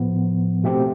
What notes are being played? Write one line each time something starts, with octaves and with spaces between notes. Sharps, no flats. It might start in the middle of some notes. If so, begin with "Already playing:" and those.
Already playing: A2 F3 B3
B2 A3 C4 G4